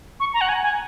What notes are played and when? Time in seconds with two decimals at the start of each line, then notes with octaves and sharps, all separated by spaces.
0.20 C#6
0.34 A#5
0.41 F#5
0.49 G#5
0.63 G#5